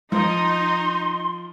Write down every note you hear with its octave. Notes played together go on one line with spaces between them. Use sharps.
F3 D#4 C6